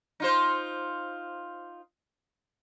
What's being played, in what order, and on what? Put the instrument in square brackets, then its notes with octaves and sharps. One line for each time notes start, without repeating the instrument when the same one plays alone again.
[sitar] D#4 F4 C5